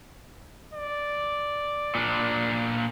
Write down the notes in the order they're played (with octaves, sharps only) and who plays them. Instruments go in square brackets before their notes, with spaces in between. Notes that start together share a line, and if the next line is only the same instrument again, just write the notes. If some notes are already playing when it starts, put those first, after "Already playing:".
[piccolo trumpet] D5
[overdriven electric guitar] A#2 D4